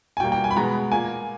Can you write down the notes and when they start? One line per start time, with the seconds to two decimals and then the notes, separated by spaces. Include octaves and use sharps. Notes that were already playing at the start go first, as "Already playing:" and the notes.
0.17 G#5
0.20 B2 G3 A#3 G5
0.32 G5
0.44 G#5
0.51 B5
0.56 B2 G#3 B3 A#5
0.92 A#2 A#3 G#5